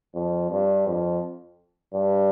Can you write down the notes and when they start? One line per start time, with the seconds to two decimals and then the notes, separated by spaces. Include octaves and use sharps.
0.15 F2
0.51 G2
0.87 F2
1.94 G2